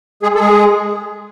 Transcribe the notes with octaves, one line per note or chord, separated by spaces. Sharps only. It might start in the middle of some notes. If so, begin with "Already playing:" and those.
G#3 G#4
A4
G#3 G#4